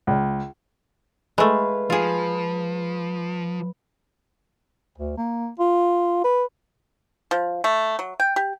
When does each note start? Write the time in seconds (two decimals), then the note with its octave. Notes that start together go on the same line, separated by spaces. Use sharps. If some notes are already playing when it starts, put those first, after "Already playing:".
0.07 C#2
1.38 G#3 A3 B4 F5
1.90 F3 F4 G#4
4.98 D2
5.18 A#3
5.60 F4
6.24 B4
7.31 F3
7.64 A3
7.99 F#3
8.20 G5
8.36 G4